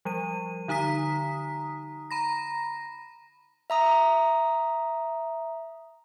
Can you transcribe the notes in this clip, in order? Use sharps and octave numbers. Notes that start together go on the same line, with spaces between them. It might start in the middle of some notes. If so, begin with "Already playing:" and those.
F3 G3 D#7
D3 D#4 A#5 D#6 B6
A#5 B5 A#6
E5 A#5 D#6